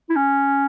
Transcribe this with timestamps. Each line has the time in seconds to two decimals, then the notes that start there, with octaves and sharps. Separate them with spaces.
0.10 E4
0.16 C#4